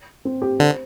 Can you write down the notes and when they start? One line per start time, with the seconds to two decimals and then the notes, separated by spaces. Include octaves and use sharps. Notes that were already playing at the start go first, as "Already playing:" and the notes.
0.25 C4
0.42 G4
0.60 D3 C5